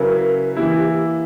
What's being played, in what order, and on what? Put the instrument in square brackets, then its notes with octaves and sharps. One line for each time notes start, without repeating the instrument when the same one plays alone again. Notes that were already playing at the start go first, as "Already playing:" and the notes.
Already playing: [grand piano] C#3 F#3 C#4 E4 B4 [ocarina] A#4
[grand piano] E3 A#3 E4 [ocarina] G4